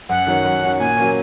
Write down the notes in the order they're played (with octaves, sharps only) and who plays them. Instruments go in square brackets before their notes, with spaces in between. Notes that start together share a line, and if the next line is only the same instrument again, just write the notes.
[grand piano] F#2 [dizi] F#5
[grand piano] D#3 F#3 C#4
F#2
D#3 F#3 C#4
[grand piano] A#2 [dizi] G#5
[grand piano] F#3 A#3 C#4